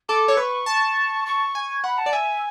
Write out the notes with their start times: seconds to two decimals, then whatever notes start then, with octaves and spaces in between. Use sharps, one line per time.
0.09 A4 D6
0.28 C#5
0.37 B4 C#6
0.66 A5
1.26 C#6
1.55 G#5
1.84 F#5 B5
1.98 A5
2.06 D5
2.13 E5 G#5